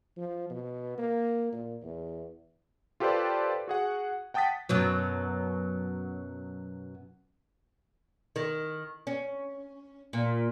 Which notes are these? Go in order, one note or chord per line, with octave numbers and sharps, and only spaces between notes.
F3
B2
A#3
A#2
E2
F4 G4 A4 B4 C5 D5
F#4 G#4 F#5
F#5 G5 A5 D#6 A6 B6
F#2 B2 F#3
D#3
C#4
A#2